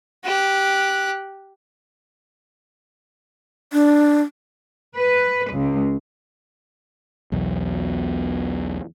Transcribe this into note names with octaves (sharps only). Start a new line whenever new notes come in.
G4 F#6
D4
B4
C#2
B1 E2 B2